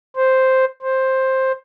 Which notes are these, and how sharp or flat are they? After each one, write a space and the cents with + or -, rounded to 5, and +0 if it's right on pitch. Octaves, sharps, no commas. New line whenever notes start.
C5 +0
C5 +10